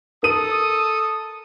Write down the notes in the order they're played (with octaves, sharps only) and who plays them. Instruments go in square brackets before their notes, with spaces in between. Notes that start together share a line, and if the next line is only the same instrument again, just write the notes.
[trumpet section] A4 D#6 [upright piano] A#4 D#7